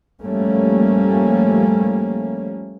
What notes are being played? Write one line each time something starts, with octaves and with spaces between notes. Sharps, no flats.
F3 G3 A3 A#3 C#4